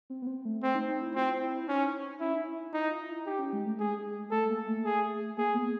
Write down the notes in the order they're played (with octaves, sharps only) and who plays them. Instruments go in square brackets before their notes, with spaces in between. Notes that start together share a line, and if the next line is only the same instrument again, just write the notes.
[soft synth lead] C4
B3
C4
A3
[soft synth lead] A3 [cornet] C4
[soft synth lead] D#4
D#4
E4
[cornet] C4 [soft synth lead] F4
[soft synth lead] E4
E4
[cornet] C#4 [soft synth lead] D#4
[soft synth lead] C#4 [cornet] E4
[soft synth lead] D#4
E4
E4
[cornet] D#4 [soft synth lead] E4
[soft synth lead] F4
E4
[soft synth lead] D#4 [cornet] G4
[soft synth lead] C#4
G#3
A3
[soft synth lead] G#3 [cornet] G#4
[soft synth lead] A3 [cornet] A4
[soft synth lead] A#3
A3
[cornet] G#4
[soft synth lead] A#3 [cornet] G#4
[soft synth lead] B3